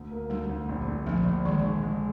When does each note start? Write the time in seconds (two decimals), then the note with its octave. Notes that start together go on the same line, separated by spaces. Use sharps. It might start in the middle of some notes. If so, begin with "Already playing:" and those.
Already playing: D2
0.11 A#3
0.30 D2 G3
0.49 D2
0.69 A#1
0.88 A#1
1.06 A#1 F3
1.26 A#1
1.45 D#3 G#3
1.64 D3
1.83 G#3